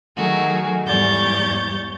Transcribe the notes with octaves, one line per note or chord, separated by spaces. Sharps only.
D#3 F#3 A3 F#4 G#4
E2 G#2 G3 C#5 G6 A6